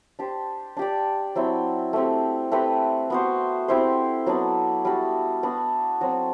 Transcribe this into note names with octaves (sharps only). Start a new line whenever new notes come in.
D4 G4 C5
D4 G4 D5
F#3 C4 E4
A3 C4 G4
A3 C4 G4 B4
B3 F#4 C5
C4 E4 G4 C5
F#3 B3 D4
G3 D4 F#4
B3 D4 F#4
F#3 C4 F#4